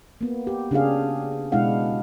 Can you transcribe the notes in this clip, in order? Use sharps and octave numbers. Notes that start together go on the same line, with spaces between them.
A#3 B3
G4
C#3 D4 G4 G#4 F5
B2 G#3 D4 E4 F5 F#5